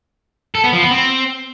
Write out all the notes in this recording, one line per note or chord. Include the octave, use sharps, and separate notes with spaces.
A4
B3
F3
B3
C4